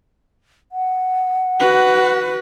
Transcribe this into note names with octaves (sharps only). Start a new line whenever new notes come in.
F#5
F#4 B4